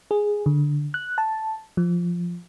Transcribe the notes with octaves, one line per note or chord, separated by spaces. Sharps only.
G#4
D3
F#6
A5
F3